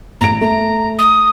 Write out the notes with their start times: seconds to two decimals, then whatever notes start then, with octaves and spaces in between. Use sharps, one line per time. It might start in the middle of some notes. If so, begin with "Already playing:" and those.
0.21 A1 A#5 D7
0.41 A3 A#5
0.99 D#6